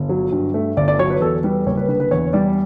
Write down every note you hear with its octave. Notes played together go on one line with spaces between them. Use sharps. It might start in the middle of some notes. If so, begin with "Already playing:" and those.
Already playing: G1
F#3
G2
A3
G1 D5
D5
F#3 C#5
B4
E2 A4
G3 B4
F#1 C#5
B4
D3 B4
B4
E2 C#5
G3 D5